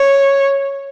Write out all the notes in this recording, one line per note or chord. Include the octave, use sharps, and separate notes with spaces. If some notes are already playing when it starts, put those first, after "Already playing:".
Already playing: C#5